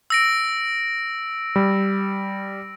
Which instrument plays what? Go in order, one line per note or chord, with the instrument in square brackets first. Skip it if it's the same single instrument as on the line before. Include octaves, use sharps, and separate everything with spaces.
[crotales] E6 A#6 D7
[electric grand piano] G3